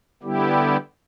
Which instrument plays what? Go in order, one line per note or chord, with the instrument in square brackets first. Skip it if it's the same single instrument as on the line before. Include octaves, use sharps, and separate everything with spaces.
[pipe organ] D3 G3 B3 E4 G4